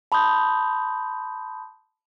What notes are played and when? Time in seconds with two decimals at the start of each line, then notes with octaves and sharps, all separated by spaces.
0.12 A5 B5 C6 D#6 G6